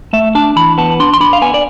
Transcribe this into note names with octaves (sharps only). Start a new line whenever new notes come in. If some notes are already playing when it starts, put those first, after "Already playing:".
A3 E5
D4 A5
E3 B5
B3 A5
D4 C6
C6
D4 B5
F5
B3 G#5
D5